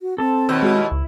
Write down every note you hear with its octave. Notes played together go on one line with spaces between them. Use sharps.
F#4
C4 A4 A5
D#2 B2 E4 E6 G6
G#3 F#4 F6
C#2